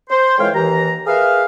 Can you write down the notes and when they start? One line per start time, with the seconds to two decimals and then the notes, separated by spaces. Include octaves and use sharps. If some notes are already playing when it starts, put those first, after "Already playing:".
0.10 C5
0.39 F2 E3 G#3 C#5 F5 G5
0.55 D#2 E3 A#5
1.07 G#4 A#4 B4 E5 F5